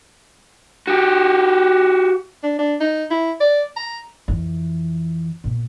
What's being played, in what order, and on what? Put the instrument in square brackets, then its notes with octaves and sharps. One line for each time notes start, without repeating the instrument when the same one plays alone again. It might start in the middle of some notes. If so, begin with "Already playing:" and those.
[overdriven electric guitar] F#4 G4
[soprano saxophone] D4
D4
D#4
E4
D5
A#5
[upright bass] F2 E3
A#2